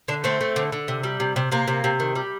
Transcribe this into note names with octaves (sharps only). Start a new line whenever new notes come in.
D3 D4
A3 C4
A3
D3
D3
C3
G3
C3
C3
C3 A#3
C3
C3
D#3
G3